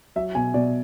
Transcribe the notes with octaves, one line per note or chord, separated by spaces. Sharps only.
F#3 E5
B2 G#5
B2 D5